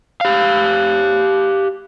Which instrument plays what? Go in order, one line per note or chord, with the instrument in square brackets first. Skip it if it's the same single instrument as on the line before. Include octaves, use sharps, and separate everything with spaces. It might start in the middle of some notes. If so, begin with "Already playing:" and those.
[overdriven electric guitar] G4 F5